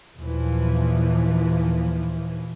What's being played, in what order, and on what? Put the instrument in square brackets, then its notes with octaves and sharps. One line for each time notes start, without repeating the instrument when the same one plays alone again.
[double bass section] D#2 A#2 E3 F3